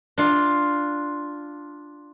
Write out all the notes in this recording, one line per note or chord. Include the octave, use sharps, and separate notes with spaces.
D4 F4